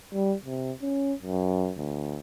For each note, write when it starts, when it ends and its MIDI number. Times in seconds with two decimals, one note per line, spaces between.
0.14 0.35 55
0.45 0.72 48
0.82 1.14 61
1.23 1.73 42
1.78 2.20 38